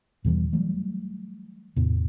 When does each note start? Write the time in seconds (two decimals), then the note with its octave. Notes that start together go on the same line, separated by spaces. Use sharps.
0.25 E2 B2 E3 G3
0.53 E3 F#3 G3 A3
1.76 E2 A2 C3